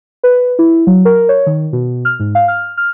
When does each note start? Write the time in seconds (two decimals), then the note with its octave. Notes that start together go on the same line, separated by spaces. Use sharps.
0.24 B4
0.59 E4
0.87 F#3
1.05 A#4
1.29 C#5
1.46 D#3
1.73 B2
2.05 F6
2.20 G#2
2.35 F5
2.48 F6
2.77 F6